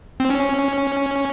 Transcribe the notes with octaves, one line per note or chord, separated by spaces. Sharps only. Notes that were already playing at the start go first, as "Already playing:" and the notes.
C4
C#4